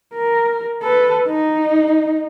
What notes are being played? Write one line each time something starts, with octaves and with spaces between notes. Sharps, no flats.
A#4
A4 B4
D#4